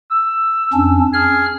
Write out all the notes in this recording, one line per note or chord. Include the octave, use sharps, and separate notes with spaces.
E6
F2 C#4 D4
G#4 F6